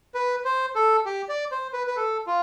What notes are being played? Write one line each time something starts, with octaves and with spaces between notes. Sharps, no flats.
B4
C5
A4
G4
D5
C5
B4
B4
A4
F4